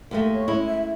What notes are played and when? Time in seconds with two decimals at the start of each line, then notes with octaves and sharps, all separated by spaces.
0.11 D#2 G#3 A3 A#4
0.33 C#5
0.48 G#3 C#4 E4
0.65 E5